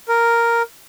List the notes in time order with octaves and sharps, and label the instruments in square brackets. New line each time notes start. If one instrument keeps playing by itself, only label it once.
[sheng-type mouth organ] A#4